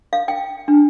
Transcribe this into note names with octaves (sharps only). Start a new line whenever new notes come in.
F5
G5
D4